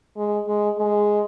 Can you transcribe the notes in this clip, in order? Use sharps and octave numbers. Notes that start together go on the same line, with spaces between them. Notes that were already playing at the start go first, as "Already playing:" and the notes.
G#3
G#3
G#3